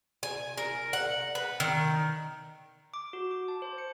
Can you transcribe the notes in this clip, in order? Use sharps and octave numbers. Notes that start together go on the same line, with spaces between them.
G#5
A#4
F#5
B4
D#3
D6
F#4
D6
A5
C5
C#7